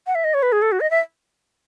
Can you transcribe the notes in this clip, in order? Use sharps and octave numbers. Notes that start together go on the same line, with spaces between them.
F#5
E5
D#5
C#5
B4
G#4
A4
F#4
D#5
E5